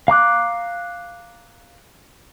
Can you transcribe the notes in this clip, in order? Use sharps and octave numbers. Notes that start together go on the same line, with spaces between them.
F5 A#5 D6 F#6